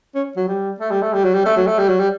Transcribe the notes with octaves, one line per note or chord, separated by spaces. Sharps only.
C#4
F#3
G3
A3
G3
A3
G3
F#3
G3
A3
F#3
A3
G3
F#3
G3